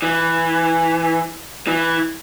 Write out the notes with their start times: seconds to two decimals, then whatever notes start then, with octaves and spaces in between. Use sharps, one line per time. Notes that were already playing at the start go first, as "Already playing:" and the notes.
0.02 E3
1.67 E3